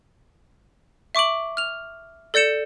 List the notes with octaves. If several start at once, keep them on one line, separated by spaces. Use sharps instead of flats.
E5 C#6 D6 D7 F#7
F6 F7
A4 D5 G6 C#7 E7